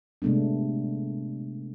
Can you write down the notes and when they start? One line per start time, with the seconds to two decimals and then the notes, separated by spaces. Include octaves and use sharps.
0.22 C3 G#3 A3 B3 D4